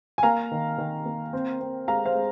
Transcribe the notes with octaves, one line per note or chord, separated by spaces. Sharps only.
G#5
A#3 F5 A#5
D#3
D#3
A#3
C4
C4
G#3 F5 A#5
C5 F5
G#3